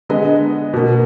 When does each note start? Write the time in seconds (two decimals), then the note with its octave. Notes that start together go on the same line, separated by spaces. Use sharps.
0.09 D3 G#3 B3 D#5
0.73 B2 A#3